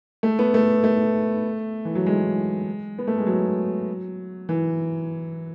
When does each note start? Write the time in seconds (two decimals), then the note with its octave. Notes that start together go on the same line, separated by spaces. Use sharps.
0.23 A3
0.39 B3
0.54 A3
0.84 A3
1.85 E3
1.95 F#3
2.06 G#3
2.99 B3
3.08 A3
3.18 G#3
3.27 F#3
4.49 E3